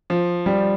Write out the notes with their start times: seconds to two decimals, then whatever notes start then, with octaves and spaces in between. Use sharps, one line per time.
0.10 F3
0.46 G3